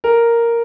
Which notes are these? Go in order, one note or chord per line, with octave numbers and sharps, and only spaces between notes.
A#4